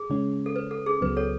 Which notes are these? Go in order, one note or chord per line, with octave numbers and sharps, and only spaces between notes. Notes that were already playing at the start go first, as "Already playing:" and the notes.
Already playing: G#4
C#3 G#3 C#4
A4
B4
A4
G#4
C#2 C#3 F#3 B3 B4
A4 C#5